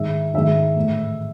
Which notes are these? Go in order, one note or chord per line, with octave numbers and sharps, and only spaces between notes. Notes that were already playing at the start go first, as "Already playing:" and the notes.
Already playing: G#2 D#3 E5
G#2 D#3 E5
A2 E3